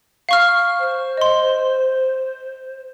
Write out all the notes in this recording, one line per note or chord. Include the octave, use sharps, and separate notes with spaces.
F5 C#6 F6
C5
D#5 C6